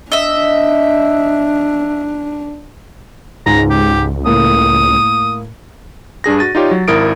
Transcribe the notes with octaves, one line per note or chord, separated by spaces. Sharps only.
D4 D#5 E5
C#2 G#2 A#5
G4
A2 A#3 D#6
G2 D4 G#4 A#6
F#4 A6 D#7
D#4 F4 G4 C#5 D5
F#3
G#1 E4 A#4 D#6 D7